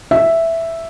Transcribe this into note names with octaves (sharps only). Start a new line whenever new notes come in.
E5